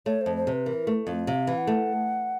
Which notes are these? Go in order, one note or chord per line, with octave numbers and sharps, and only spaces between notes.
A3 C#5
F2 C5
C5
C3 B4
E3 A#4
A3
F2
C3 F5
E3
F#5
A3